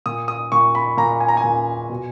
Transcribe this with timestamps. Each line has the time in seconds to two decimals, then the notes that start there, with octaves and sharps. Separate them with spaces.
0.06 A#2 D#6
0.28 D#6
0.52 A#2 C#6
0.75 B5
0.97 A#2 A#5
1.20 G#5
1.28 A#5
1.37 G#5
1.44 A#2
1.90 B2